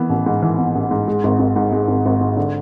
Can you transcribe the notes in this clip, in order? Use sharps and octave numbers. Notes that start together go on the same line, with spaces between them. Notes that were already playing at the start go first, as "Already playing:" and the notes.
Already playing: E3 B3
A1
G#2
E3
B3
A1
G#2
G#3
G#1
G#1
G#2
G#3
G#1
G#1
G#2
D3